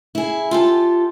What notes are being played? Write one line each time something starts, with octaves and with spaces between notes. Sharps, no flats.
E4 G#4
F4 G4 A4